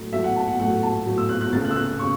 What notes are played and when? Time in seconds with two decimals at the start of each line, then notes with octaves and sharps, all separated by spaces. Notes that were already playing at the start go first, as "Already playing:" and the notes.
Already playing: A2 F#3 A3
0.13 A2 F#3 A3 E5
0.24 F#5
0.36 A5
0.48 F#5
0.60 A2 F#3 A3 F#5
0.83 A5
1.06 A2 F#3 A3
1.18 E6
1.29 F#6
1.41 F#6
1.52 C#2 C#3 A3 A6
1.65 F#6
1.71 E6
1.76 F#6
1.99 C#3 C#6